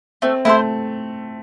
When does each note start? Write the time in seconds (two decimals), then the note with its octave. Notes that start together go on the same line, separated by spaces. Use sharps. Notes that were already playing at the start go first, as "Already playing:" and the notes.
0.22 A3 C4
0.45 A3 E4 A4 C5